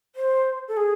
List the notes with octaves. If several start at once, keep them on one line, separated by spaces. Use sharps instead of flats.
C5
A4
G#4